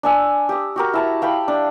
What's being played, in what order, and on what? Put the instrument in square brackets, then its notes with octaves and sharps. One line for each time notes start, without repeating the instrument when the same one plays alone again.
[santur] D4 G#5 E6
G4 D#6
F#4 G4 A#4
E4 A5 A#5
F5 G5 A5 B5
D4